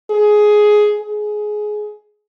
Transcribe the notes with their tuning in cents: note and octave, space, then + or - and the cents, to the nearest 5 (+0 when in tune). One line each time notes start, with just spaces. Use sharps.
G#4 +10
G#4 +20